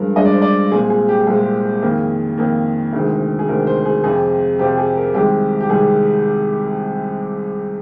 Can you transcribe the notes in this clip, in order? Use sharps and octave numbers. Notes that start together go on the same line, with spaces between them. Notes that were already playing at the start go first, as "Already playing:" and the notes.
Already playing: G2 F3 G#3 A#4
G2 F3 G#3 D#5
D5
C5
D5
C2 A#2 G#3 C4 G#4
G#4
G4
C2 A#2 G#3 C4 G#4
F2 D#3 A#3
F2 D#3 A#3
D2 C3 D#3 G#3
G#4
D2 C3 D#3 G#3 A#4
C5
G#4
F2 C3 F3 C4 G#4
F2 C3 F3 C4 G4
G#4
A#4
C2 C3 D#3 G#3 G4
G4
C2 C3 D#3 G#3 G#4